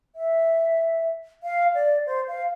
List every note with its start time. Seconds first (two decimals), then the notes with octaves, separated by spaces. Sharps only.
0.15 E5
1.43 F5
1.75 D5
2.06 C5
2.28 F5